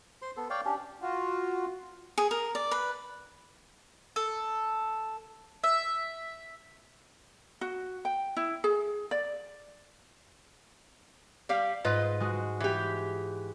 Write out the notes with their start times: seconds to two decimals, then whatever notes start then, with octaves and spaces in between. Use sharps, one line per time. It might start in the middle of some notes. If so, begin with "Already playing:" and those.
0.22 C5 C6
0.37 B3 A4
0.50 C#5 D5 F5 G5
0.65 C#4 D4 G4
1.02 F4 F#4
2.18 G#4
2.31 A#4
2.55 D5
2.71 B4
4.16 A4
5.64 E5
7.61 F#4
8.05 G5
8.37 E4
8.64 G#4
9.11 D5
11.49 G3 G4 F5
11.85 G#2 F4 B4 D#5
12.20 G#3 F#4
12.60 E3 G4